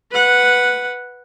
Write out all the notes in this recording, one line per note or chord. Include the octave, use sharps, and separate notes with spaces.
B4 F#5